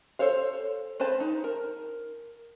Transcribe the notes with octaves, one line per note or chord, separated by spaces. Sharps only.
A4 C5 C#5 F5
C4 B4 C5 A5
D#4
A#4